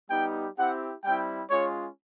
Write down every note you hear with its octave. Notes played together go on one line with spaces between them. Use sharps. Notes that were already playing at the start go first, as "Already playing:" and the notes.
G3 B3 D#4 G4 G5
C4 E4 G4 F#5
G3 C4 E4 G5
G#3 C#4 F4 C#5